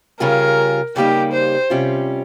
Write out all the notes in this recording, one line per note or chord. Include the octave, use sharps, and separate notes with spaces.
C#3 G3 C#4 F4 G#4 A#4
C#3 G3 A#3 D#4 G4
C5
C3 G3 C#4 F4